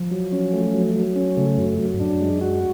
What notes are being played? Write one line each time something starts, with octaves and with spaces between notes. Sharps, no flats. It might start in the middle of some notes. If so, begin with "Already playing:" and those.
Already playing: F3
F#3
C#4
A3
F#3
F#3
C#4
C#3 A3
F#2 F#3
F#3
G#2
F#2 D4
G#3
F#4